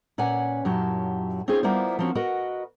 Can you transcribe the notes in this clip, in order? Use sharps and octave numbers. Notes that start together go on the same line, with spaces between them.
A#2 C#4 B4 F#5 G#5
F#2 A#2 F#3 E4 G4 A5
C4 C#4 D#4 F4 G#4 C5
G3 A#3 B3 E4 F4 C5
F3 A#3 C4 C#4 F#4
F#4 A#4 B4 D#5 F#5